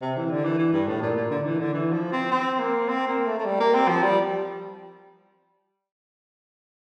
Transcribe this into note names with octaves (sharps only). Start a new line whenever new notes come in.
C3
E3
D3
E3
E3
G2
A2
A#2
A#2
D3
E3
D3
E3
F3
C4
C4
A#3
C4
A#3
A3
A3
G3
A#3
C4
F3
G3